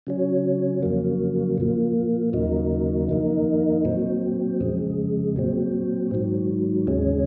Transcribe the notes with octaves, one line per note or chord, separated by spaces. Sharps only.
C#3 F#3 C#4
F2 C#3 F#3 A#3
A#2 F3 A#3
D#2 C#3 F#3 A#3 D#4
F2 D#3 A#3 D#4
A#2 F#3 C4
F2 C#3 G#3
A#2 F#3 C4
G#2 D#3 F#3
D#2 C#3 G#3 C#4